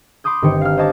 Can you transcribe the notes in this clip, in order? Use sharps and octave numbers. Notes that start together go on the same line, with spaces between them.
B5 C6 D6 D#6 G6
G1 D#3 C4 C5 G5 C#7
F5 F6
C5 C#5 D#5 G5 A5 D6